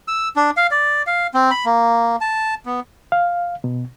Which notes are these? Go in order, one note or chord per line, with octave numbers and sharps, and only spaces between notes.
E6
D4
F5
D5
F5
C4
B5
A#3
A5
B3
F5
B2